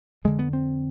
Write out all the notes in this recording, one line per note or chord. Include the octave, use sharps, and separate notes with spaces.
F2 D3 G#3
B3
C4